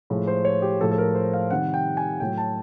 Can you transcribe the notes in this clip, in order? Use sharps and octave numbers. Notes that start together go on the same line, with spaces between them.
A2 F3 G#3
C5
C#5
G4
A2 F3 G#3 A4
A4
A#4
C5
F5
C3 D#3 G3 F#5
G5
G#5
A2 F#3 G5
A5